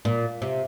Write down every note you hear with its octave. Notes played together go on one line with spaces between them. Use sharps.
A#2
C3